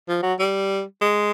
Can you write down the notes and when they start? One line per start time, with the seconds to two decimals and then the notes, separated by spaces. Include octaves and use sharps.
0.08 F3
0.23 F#3
0.39 G3
1.01 G#3